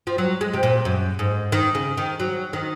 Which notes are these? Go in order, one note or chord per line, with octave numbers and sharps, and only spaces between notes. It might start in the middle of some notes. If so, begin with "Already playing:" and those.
F3
F#3
G#3
C3
A#2
F#2
G#2
D#3
C#3
D#3
F#3
D#3